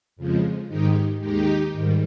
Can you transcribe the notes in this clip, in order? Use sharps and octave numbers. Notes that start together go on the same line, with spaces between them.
F2 C#3 F3 G#3
G#2 D#3 G#3 D#4 G4
D#2 D#3 G#3 D#4 G4
G#2 D#3 G3